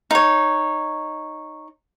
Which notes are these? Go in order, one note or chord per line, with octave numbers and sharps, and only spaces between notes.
D#4 C#5